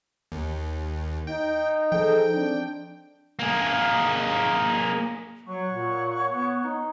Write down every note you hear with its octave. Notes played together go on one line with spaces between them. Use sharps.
D#2
D#4 G5
F3 G#4 A4 G5
C4 D4
A#3 G#4
F#3 C#5 F#5 C#6
A#2
B3
D#4